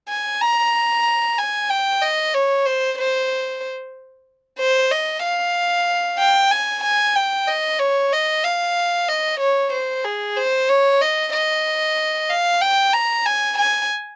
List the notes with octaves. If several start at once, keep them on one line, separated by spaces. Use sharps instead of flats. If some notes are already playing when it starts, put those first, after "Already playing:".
G#5
A#5
G#5
G5
D#5
C#5
C5
C5
C5
D#5
F5
G5
G#5
G#5
G5
D#5
C#5
D#5
F5
D#5
C#5
C5
G#4
C5
C#5
D#5
D#5
F5
G5
A#5
G#5
G#5